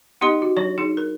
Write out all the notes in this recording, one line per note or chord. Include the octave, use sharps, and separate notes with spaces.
B3 D#4 G4 D#5 C6
F#4
F#3 D4 C#5
D#4 G#4
A#4